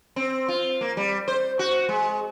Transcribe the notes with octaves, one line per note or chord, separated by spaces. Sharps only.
C4
F4
A#3
G3
C5
F#4
G#3